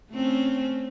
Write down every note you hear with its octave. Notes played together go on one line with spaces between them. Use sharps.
A3 C4 C#4